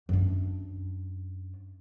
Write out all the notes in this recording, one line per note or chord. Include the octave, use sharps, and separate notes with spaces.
F#2 D4